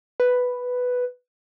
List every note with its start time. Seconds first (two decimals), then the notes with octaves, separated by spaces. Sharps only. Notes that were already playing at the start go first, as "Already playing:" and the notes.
0.20 B4